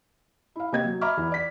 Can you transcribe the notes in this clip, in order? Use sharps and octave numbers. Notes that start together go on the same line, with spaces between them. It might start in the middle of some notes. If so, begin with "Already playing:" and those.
E4 F5
C3 A#3 C4 D#5 G#6
F#3
D#5 E5 A#5 B5 D6 F6
E2 E4
D5 B6